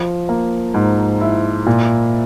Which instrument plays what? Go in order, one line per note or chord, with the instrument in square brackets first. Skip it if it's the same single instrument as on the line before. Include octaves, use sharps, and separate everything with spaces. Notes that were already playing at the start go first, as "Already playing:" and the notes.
Already playing: [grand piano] F3
A#3
G#2
E4
A#2